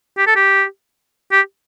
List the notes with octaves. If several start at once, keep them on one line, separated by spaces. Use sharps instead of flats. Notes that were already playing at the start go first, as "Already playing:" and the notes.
G4
A4
G4
G4